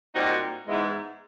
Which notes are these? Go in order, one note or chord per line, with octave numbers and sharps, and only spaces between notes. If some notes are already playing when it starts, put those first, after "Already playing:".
A#2 G3 C4 D#4 F#4
G#2 E3 G#3 B3 E4